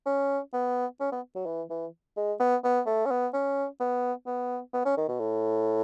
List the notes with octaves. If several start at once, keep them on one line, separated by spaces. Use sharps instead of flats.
C#4
B3
C#4
B3
F#3
E3
E3
G#3
B3
B3
A3
C#4
B3
C#4
B3
B3
B3
C#4
D#3
B2
A2